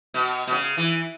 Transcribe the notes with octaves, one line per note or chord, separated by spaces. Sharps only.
B2
B2
C#3
E3